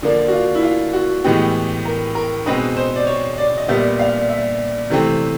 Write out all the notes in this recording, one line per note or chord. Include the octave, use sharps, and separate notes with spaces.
D3 F3 A#3 D4
F#4
F4
E4
F4
F#4
A2 E3 G#3 B3 G4
A#4
A#4
B2 G#3 C4 D#4 B4
C5
D5
C#5
D5
D#5
A#2 G3 B3 E5
F5
E5
C3 E3 A3 C4